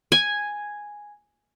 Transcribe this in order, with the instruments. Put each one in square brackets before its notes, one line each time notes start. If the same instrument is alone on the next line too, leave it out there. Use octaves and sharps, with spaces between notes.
[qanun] G#5